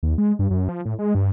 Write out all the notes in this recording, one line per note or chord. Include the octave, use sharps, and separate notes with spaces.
D#2
G#3
G2
F#2
F3
A2
G#3
G2